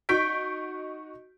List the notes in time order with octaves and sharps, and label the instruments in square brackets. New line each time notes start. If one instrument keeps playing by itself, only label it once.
[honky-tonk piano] D#4 F#4 C#6 G6 B6 D7